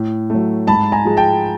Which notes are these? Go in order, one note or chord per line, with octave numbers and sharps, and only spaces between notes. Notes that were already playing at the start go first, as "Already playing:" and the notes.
Already playing: A2
F#3 A3
G#2 A5 B5
G#5 A#5
F3 G#3
G5 A5